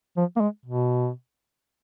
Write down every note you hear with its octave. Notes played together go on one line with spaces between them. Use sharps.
F3
A#3
G#3
B2